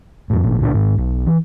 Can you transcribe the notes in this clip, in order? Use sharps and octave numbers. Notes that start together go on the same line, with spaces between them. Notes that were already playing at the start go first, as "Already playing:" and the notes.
F2 A2
G#1 A#2
C#2 A#2 C#3 D4
G#1 G#2
B1
E3